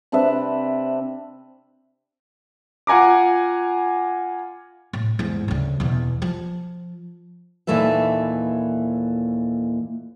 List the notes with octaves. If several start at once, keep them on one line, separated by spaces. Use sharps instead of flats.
C3 D4 B4 E5
F4 F#5 G#5 A#5 D6
A2
E2 G#2
D2 C#3
E2 B2
F3
D#2 A#2 E3 A3 B4 E5